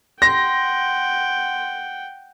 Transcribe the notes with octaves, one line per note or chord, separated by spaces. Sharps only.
F#5 G5 C6 A#6